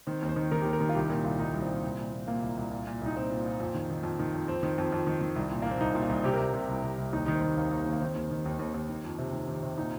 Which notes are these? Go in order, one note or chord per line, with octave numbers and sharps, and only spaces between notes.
D#3 C4
D#2
C5
D#3
D#3 A#4
D#2 G4
A#4
D#3
F4
C2 G4
A#2 A#4
C2 F4
C2 D#4
C2
C4
A#2
C2
A#2
A#2
A#2 A#3
C2
C2
A#2
A#2
C2 D#4
A#2 C4
A#2
A#2
F2
D#3
D#3
F2
D#3
F2
F2 C4
D#3
F2
F2
D#3
D#3
C2
A#2
A#3
A#2 C4
C2 D#4
A#2
F4
C2
C3 G4
A#4
C2 G4
C3
C2
C3
C2
D#2 D#4
D#3 D#4
C4
D#3
D#2 A#3
D#2
D#2
A#3
D#3 C4
D#2
D#3
D#2
D#2
D#2
D#3
F2
C3
D#3
D#3
C3
A#2 D#4